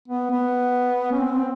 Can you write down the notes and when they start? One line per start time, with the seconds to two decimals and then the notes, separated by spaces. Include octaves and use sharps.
0.08 B3
0.31 B3
1.12 C#4
1.19 C4
1.30 B3
1.34 C4